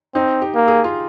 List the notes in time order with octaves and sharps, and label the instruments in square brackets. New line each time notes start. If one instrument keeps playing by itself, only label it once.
[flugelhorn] C4 [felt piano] D#4
[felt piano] G4
[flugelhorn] A#3
[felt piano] G#4
F4